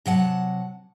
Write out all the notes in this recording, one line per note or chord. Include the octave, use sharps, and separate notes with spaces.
C3 F#3 F#5 A5